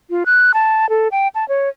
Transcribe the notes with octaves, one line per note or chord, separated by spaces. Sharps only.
F4
F#6
A5
A4
G5
A5
C#5